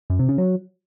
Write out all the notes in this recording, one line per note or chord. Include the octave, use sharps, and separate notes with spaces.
F#2
C3
C#3
F#3